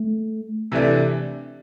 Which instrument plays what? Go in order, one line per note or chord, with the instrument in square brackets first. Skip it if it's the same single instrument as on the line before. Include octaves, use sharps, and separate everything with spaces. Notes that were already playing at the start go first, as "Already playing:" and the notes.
Already playing: [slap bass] A3
[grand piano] C3 E3 A3 D4